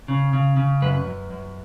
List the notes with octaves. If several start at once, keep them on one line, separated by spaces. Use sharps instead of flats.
C#3
C#3
C#3
F#2 B4
F#2
F#2